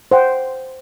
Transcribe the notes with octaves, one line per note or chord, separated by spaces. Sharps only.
C5 F#5 G5